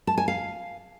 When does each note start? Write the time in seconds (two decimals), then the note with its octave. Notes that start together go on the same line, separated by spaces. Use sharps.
0.07 A5
0.18 G#5
0.28 F5